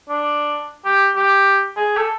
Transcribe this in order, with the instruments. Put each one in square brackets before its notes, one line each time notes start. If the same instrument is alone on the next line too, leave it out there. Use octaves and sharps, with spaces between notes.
[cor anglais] D4
G4
G4
G#4
A4